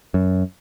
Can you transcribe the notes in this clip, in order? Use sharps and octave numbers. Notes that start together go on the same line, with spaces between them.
F#2